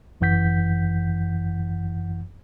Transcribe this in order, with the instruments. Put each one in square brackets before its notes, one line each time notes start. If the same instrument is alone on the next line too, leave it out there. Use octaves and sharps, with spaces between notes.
[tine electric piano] G1 F#2 E3 F#5 G6 B6